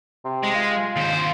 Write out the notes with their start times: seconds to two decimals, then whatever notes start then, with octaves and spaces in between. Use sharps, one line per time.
0.25 C3
0.43 G#3
0.55 F4
0.96 D#2 C5